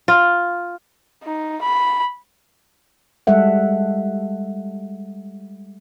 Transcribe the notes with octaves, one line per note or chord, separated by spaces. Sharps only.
F4
D#4
B5
G3 G#3 A4 E5 F#5